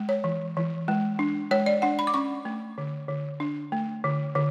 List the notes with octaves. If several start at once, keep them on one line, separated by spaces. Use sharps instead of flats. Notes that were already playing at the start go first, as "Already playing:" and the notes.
Already playing: G#3
C#5
E3
E3
G#3
D4
G#3 C#5
D5
D4 F#5
B5
D6
C#4 C#6
A3
D3
D3
D4
A3
D3
D3